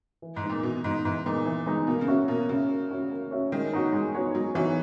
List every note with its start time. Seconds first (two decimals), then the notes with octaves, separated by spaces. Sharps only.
0.22 E3
0.36 G#2
0.43 G#3 B3 D#4
0.49 A#2
0.63 B2 E3
0.84 G#2 G#3 B3 D#4
1.05 G#2 E3
1.25 A#2 G#3 B3 D#4
1.45 E3
1.66 G#3 B3 D#4
1.87 B2 A#3
2.01 C#3
2.08 C#4 F#4 C#5 E5
2.28 B2 A#3
2.49 C#3 C#4 F#4 C#5 E5
2.69 A#3
2.90 C#4 F#4 C#5 E5
3.11 A#3
3.31 C#4 F#4 C#5 E5
3.52 D#3 G#3
3.72 B3 D#4 F#4 C#5
3.93 G#3
4.15 B3 D#4 F#4 C#5
4.35 F#3 G#3
4.55 E3 B3 D#4 F#4 C#5